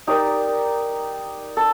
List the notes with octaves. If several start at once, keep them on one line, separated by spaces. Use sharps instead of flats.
D#4 G4 A#4 D5
A4